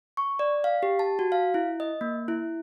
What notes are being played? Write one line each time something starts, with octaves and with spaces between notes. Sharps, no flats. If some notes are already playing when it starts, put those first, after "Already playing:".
C#6
D5
F5
G4
A5
F#4
F5
E4
D#5
A#3
E4